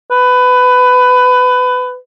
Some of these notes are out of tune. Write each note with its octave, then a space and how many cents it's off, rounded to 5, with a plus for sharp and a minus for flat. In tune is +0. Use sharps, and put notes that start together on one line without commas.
B4 +20